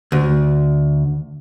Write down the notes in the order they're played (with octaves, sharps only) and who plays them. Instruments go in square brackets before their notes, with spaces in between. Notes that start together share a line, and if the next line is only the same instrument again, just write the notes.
[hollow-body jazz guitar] D2